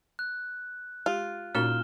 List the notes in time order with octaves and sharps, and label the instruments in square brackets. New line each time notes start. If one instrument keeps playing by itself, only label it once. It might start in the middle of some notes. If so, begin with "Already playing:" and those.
[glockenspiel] F#6
[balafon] G#3 G4 [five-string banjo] F4
[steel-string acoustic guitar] A#2 [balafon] C#4 D#4 F#4 [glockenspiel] F6 E7 G7